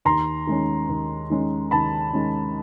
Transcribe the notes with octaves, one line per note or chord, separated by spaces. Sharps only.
D#2 A#5 C6
D#3 G#3 C#4
D#2
D#3 G#3 C#4
D#2 A5 B5
D#3 G#3 C#4